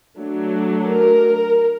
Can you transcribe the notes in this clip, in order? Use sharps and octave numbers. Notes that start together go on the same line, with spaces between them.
F#3 A3 D4
A#4